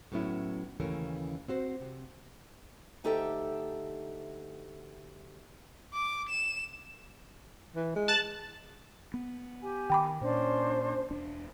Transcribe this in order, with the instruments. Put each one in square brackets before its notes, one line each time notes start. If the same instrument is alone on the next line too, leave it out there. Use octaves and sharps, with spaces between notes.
[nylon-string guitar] A2 F#3 B3 C#4 E4
D#2 C#3 E3 A3 C#4 A#4
C4 F#4 C5
C3
[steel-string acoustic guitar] D2 D#4 G4 A4 E5 G5
[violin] D6
E7
[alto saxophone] E3
G#3
[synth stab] A5 F#6 A6
[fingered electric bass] B3
[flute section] G4 G#5
[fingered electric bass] D#3 [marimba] G5 B5 D6
[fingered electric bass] A#2 [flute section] C#4 D4 C5
[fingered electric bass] E1 D4